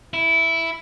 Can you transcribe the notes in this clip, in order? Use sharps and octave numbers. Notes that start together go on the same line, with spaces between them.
E4